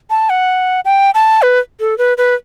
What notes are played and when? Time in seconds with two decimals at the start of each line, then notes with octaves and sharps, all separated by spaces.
0.10 A5
0.30 F#5
0.85 G5
1.14 A5
1.42 B4
1.80 A4
1.98 B4
2.18 B4